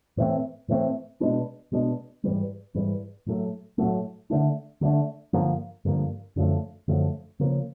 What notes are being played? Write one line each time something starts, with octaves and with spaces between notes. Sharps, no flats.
A2 E3 A3 C4
A2 E3 A3 C4
B2 G#3 B3 D4
B2 G#3 B3 D4
G#2 E3 G3
G#2 E3 G3
A2 F#3 A3
A2 F#3 A3
D3 F#3 A3 D4
D3 F#3 A3 D4
G2 D3 F3 A#3
G2 D3 F3 A#3
F#2 D3 F3 A3
F#2 D3 F3 A3
C#3 F3 A#3